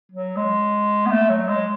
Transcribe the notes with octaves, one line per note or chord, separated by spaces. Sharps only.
F#3
G#3
B3
A3
F#3
G#3